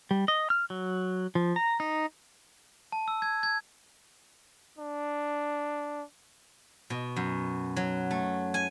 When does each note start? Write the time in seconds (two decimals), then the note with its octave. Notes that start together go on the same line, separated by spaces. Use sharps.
0.11 G3
0.28 D#5
0.50 F6
0.70 F#3
1.35 F3
1.56 A#5
1.80 D#4
2.92 A5
3.08 E6
3.22 G#6
3.43 G#6
4.78 D4
6.90 B2
7.16 F#2
7.76 F#3
8.11 A3
8.54 G#5